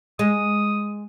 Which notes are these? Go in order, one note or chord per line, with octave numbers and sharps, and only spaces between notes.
G#3 D#6